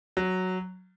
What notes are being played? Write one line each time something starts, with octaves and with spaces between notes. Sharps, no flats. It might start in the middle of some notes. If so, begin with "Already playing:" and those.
F#3